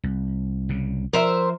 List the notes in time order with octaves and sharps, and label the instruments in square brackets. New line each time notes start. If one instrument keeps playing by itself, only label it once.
[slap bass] C2
C2 C#3
[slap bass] F3 [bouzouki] A#4 C5 E5